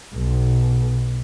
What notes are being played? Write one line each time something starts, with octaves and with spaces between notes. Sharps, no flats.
B1